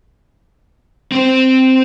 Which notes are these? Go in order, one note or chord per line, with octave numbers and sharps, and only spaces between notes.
C4 C5